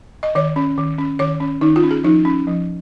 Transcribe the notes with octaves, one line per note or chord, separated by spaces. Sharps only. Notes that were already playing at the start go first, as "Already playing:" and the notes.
D#5
D#3 C#5
C#4
D#3
C#4
D#3 C#5
C#4
D#3 D#4
F4
C#4
G#4
F3 D#4
C#4
F3